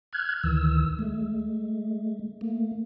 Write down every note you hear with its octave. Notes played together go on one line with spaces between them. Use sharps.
F6 F#6 G#6
D2 D#3 E3 E6
G#3 A3
A3 A#3